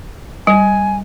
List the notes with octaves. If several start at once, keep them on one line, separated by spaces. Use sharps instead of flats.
G3 G#5